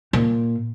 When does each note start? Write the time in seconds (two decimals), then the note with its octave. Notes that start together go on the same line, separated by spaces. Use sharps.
0.13 A#2